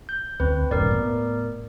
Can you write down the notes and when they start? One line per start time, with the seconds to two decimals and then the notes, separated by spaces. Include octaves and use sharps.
0.09 G6
0.40 D2 C4 B4
0.71 D#1 A1 G2 A#4 D5
0.91 A2 B3